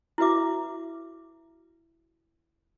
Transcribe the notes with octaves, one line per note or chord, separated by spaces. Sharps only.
E4 F#4 B4 E5 D6